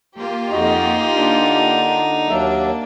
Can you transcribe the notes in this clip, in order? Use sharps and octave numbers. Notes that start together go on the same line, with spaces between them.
A#3 F4 G4
F2 D#4 F#4 D#5
D3 D4
D#2 F#3 A#3 D4 E5